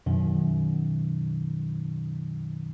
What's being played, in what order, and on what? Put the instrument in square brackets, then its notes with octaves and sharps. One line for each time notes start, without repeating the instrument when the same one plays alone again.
[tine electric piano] F#2 B2 D#3